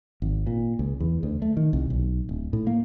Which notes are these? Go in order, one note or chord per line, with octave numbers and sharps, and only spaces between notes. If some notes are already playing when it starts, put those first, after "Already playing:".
G#1
A#2
C#2
E2
D2
A3
D#3
C2
B1
D1
A2
A#3